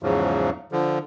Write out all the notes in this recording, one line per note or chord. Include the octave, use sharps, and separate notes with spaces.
E2 G#2 C#3 F3 F#3
D3 F3